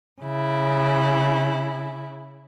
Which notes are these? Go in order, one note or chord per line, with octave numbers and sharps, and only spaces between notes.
C#3 E4